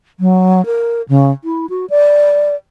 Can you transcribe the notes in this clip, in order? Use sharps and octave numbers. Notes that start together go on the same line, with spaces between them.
F#3
A#4
C#3
E4
F#4
D5